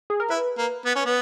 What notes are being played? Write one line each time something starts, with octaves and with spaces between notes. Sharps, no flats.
G#4
A#4
E4 B4
A#3
B3
C#4
B3